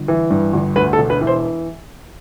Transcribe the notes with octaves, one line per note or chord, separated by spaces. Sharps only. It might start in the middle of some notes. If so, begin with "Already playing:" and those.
Already playing: G1
E3
G2
G1
D2 B4
A4
E1
B4
E3
C5